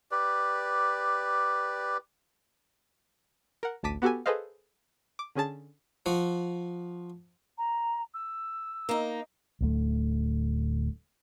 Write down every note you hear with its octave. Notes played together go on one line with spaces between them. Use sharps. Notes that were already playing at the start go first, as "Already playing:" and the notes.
G4 B4 D5
A#4 F#5
A1 D2 A5 D6 B6 D#7
B3 F#4 G4 A4 G#5
G#4 A4 B4 C5 D#5 F5
D6
D3 C#4 G#4 A5 A6
F3 F#4
A#5
E6
A#3 D#4
D1 D2 A3